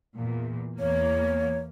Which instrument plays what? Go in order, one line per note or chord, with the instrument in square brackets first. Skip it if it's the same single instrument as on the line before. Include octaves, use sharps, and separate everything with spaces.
[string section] E2 A#2
[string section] E2 A#3 [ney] C#5